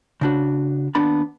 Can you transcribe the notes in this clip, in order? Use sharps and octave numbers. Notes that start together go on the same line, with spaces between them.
C#3 D4 F#4
D#2 B3 D4 A5 B5